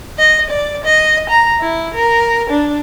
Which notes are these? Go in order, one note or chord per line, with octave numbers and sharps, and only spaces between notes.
D#5
D5
D#5
A#5
E4
A#4
D4